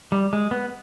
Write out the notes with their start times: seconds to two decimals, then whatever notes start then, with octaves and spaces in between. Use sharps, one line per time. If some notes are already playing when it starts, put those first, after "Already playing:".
0.12 G3
0.33 G#3
0.51 B3